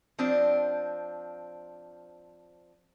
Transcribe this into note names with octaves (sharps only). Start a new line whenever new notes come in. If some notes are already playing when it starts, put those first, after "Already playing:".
F3 C4 D4